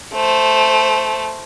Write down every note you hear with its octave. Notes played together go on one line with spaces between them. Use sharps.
A3 C5